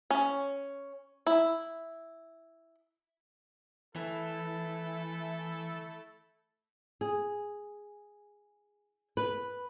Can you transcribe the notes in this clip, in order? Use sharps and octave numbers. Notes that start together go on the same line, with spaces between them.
C#4
E4
E3 A3 E4 A4
G#4
B4